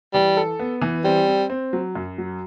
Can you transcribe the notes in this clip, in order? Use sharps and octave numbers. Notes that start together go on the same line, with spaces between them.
E3 G3
A4
B3
E3
G3 C4
C4
C4
F#3
F#2
F#3